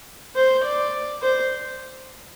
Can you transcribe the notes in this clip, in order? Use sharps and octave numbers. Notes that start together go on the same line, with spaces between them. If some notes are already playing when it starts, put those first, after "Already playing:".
C5
D5
C5